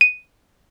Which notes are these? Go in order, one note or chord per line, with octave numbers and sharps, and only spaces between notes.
D#7